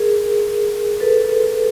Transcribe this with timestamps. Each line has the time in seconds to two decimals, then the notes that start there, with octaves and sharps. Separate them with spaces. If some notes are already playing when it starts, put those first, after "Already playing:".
Already playing: G#4 A#4
1.00 A4 B4